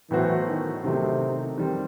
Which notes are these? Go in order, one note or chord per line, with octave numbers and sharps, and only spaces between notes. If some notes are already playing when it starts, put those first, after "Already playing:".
A2 E3 F#3 B3 F#4 C5
D#3
C3 D#3 F#3 A3 C4 D#4
D#3 G3 C4